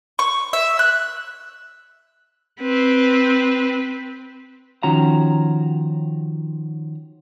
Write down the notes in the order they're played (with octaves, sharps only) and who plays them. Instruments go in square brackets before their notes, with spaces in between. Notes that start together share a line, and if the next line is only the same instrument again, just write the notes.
[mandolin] C#6
E5
F#6
[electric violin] C4 B4
[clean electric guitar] D#3 F3 C#4 F#4 A#5